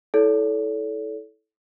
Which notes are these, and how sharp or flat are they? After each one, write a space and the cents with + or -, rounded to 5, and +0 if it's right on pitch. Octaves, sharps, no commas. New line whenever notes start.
E4 -20 A4 -15 C#5 +45